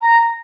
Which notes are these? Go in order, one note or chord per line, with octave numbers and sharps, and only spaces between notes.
A#5